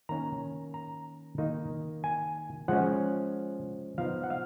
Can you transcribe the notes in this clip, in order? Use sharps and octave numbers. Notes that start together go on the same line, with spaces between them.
D#3 A#3 C#4 A#5
A#5
D#3 A#3 D#4
G#5
F3 G#3 C#4 F#5
F3 B3 D#4 F5
F#5
F5